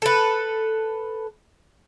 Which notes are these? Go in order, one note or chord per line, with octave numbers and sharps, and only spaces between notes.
A4 B4